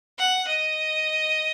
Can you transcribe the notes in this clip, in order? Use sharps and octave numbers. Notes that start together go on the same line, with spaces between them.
F#5
D#5